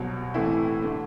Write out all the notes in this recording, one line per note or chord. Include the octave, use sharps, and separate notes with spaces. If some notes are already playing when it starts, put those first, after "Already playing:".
Already playing: C2 B2 F#3
A2 E3 A3 C4 E4
D3 A3